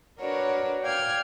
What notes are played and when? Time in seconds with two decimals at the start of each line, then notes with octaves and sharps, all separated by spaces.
0.19 D4 F#4 A#4 B4 C#5 D5
0.82 D5 F5 G5 F6 G#6